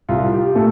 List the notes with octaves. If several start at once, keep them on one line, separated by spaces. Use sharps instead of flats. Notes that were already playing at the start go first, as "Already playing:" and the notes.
C2 F4
G4
A#2 A3 A4